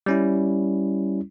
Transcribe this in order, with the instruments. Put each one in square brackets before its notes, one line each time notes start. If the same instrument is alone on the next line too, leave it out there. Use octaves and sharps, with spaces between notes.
[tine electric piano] G3 C#4 E4